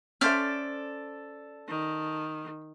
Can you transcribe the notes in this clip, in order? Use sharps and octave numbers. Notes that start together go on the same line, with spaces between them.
C#4 A4 C5 D5 E5 F6
D#3